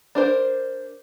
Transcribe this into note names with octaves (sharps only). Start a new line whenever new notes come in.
D4 A#4 C5